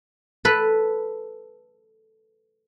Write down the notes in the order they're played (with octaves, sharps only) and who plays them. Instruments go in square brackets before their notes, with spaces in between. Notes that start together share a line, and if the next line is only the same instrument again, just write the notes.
[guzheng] A4 B4